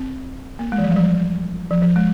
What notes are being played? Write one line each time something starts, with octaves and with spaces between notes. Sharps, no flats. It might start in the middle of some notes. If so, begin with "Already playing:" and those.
Already playing: C4
A#3
G#3
E3
F3
G3
F3
F3
F3
G#3